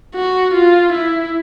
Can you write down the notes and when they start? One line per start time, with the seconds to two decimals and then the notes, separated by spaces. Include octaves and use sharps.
0.15 F#4
0.54 F4
0.93 E4